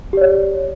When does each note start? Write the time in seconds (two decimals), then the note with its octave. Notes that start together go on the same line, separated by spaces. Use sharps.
0.13 G4
0.17 D5
0.21 C#5